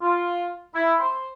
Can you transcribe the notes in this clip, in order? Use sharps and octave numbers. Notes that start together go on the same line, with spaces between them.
F4
E4
C5